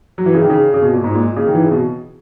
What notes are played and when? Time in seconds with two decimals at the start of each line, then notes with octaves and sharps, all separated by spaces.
0.18 F#3
0.26 E3
0.34 C#3
0.42 D#3
0.50 C#3
0.74 C#3
0.82 B2
0.93 A#2
1.04 G#2
1.14 A#2
1.36 C#3
1.47 D#3
1.55 E3
1.63 C#3
1.71 B2